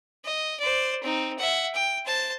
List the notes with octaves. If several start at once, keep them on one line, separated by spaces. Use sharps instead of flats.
D#5
C5 D5
C4 D#4
E5 F#5
G5
C5 A5